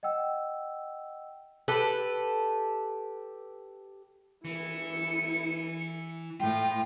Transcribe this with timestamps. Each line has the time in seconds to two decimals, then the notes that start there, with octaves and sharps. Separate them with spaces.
0.03 D#5 F#5 G5 E6
1.68 G4 A4 B4
4.45 E3 E4 C#7
6.40 A2 F4 G5